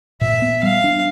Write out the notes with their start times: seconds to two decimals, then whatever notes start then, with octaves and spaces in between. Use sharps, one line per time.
0.21 A#2 E5
0.42 B3
0.63 G3 F5
0.84 D4